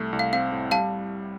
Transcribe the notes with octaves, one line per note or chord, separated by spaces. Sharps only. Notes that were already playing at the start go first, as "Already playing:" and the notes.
Already playing: C2 A3
C2
F5
C4 F5
A2
G3 F5 A5